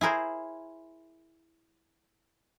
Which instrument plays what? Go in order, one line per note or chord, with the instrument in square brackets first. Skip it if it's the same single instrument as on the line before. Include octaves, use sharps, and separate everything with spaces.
[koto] E4 G#4 A#4 C5